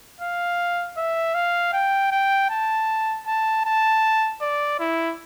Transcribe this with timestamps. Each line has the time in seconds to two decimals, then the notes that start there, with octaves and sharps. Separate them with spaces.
0.20 F5
0.97 E5
1.35 F5
1.73 G5
2.11 G5
2.50 A5
3.27 A5
3.65 A5
4.41 D5
4.80 E4